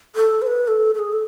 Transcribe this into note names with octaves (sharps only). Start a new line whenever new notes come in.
A4
C5
B4
A4
A4
G#4
A4